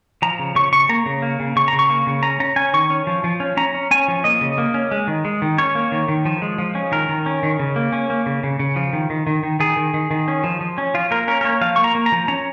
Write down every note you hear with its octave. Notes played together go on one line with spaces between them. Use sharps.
F3 A#5
C#3
C#3 C#6
C#3 C#6
A#3 A#5
C#3
A#3
C#3
C#3 C#6
C#3 A#5
C#6
A#3
C#3
C#4 A#5
C#4 A#5
C#4 G#5
D#3 C#6
C#4
F3
F3
C#4
C#4 A#5
C#4
C#4 G#5
F3
A#3 D#5
C#3
A#3
C#4
G#3
D#3
G#3
D#3
C#4 C#5
A#3
D#3
D#3
F3
G#3
F3
C#4
D#3 A#4
D#3
C#4
D#3
C#3
A#3
C#4
A#3
C#3
C#3
C#3
F3
D#3
D#3
D#3
D#3
D#3 G#4
D#3
D#3
D#3
C#4
F3
F3
C#4
F3 F4
A#3 A#4
C#4 A#4
A#4
A#3 C#5
F3 F5
A#3 C#6
A#5
A#3
A#5
F3
C#4 A#5